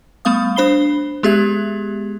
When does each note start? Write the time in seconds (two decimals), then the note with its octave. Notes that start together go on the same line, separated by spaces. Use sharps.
0.25 G3 A3 B3 F5 D#6
0.56 D4 C5 B5 C7 G7
1.23 G#3 B3 G4 G#4 E5 G#6